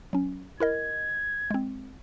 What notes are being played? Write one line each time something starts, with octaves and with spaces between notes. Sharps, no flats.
F#3 C#4
E4 A#4 D#5 G#6
G#3 C4